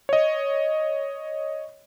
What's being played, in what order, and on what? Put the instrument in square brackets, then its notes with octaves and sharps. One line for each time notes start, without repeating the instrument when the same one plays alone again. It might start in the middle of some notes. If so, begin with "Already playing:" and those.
[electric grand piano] C#5 D#5